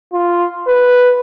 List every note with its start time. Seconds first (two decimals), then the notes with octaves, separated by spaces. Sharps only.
0.13 F4
0.67 B4